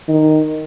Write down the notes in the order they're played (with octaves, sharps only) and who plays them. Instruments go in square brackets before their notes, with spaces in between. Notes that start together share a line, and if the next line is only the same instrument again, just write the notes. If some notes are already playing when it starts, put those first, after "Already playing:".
[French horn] D#3